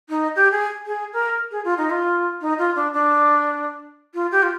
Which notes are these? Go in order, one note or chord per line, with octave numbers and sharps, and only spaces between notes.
D#4
G4
G#4
G#4
A#4
G#4
F4
D#4
F4
D#4
F4
D4
D4
F4
G4
F4